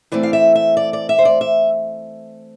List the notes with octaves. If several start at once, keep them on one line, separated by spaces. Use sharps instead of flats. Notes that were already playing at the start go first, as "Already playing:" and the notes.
E3 A3 C4 D5
F5
E5
E5
D5
D5
E5
C5
D5
E5